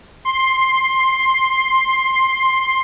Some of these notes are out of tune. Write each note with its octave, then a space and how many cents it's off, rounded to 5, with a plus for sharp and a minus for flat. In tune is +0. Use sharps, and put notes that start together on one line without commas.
C6 +10